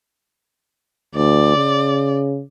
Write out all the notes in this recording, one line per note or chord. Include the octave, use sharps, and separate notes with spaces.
D2 D5
C#3